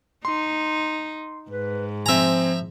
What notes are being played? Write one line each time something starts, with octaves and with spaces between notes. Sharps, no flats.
D#4 C6
G#2 B4
F3 C4 E5 G#5 A#5